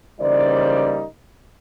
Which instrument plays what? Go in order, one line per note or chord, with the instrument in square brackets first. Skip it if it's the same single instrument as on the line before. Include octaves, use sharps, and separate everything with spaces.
[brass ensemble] C#3 E3 G3 A#3 D#4 C5 D5